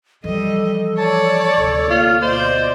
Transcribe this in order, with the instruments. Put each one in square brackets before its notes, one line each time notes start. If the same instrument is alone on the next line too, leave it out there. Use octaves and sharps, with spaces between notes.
[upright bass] E3 F3 [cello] G3 D#5 [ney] A4
[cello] C#5 D5 [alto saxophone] A5
[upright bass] D2 C3 [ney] A4
[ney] A#3 [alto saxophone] F4
[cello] B2 D5 [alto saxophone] C5 [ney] D#5